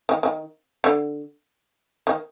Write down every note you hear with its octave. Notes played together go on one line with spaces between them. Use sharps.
D#3
D#3
D3
D#3